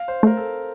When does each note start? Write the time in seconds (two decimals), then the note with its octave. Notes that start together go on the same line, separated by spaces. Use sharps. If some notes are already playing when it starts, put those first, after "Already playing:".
Already playing: F5
0.08 C5
0.23 A3 A#4
0.37 A4